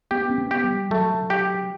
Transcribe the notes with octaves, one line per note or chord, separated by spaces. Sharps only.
B3 G4
C#4
B3
G4
G3
F#3 A3
G4